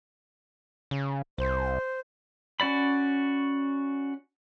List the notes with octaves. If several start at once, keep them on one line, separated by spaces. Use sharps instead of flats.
C#3
C2 C5
C#4 F#4 D5 B5